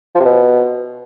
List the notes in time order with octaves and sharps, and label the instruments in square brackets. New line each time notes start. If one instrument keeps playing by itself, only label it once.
[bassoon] F3
C3
B2